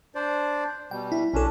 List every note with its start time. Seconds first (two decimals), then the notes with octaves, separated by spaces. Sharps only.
0.15 D4 C5 D5
0.91 B2 G3 G5
1.12 E4
1.34 B1 C#4 D4 A4